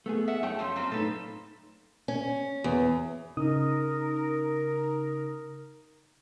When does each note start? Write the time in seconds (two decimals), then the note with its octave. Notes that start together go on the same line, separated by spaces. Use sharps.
0.06 A3 B3 G#4
0.28 E5 F#5
0.43 F#2 A3 C#5 G5
0.59 F3 G3 A3
0.76 A#3 C4 F4
0.92 A2 D#4 A4 B4
2.08 C#4
2.64 E2
3.37 C#3 D#4 A#4 D#6